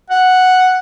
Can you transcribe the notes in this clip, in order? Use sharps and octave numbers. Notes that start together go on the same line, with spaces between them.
F#5